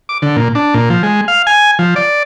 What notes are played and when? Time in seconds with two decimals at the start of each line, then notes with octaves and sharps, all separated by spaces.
0.09 D6
0.22 D3
0.36 A#2
0.55 D4
0.74 A#2
0.90 F3
1.03 G#3
1.28 F5
1.47 G#5
1.79 F3
1.96 D5